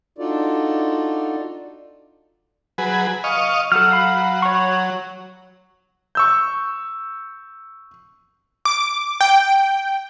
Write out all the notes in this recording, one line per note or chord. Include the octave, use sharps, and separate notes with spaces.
D4 D#4 F4 F#4 A4 D5
F#3 G#4 B4
D#5 F5 C#6
F#3 A4 F6
F5 B5
C#5 C#6
C#6 E6 G6
D6
G5